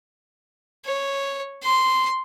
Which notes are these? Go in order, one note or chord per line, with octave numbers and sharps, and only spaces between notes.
C#5
C6